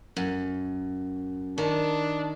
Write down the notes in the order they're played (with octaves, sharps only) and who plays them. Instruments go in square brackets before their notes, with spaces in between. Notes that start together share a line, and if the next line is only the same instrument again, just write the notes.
[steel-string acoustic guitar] F#2
[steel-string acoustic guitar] D#3 [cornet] D4